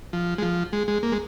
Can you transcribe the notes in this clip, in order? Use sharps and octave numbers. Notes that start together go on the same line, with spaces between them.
F3
G#3
F3
G#3
G#3
A#3
G#3